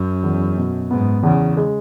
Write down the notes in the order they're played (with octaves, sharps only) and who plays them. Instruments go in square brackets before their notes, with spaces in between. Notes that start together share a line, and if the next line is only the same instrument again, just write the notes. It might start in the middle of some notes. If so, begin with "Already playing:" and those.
Already playing: [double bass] F#2
[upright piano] E2
B2
[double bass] G#2 [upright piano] B3
[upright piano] E2 [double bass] C#3
[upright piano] G#3